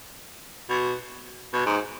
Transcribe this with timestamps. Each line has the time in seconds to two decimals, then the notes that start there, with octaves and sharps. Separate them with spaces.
0.69 B2
1.53 B2
1.66 G#2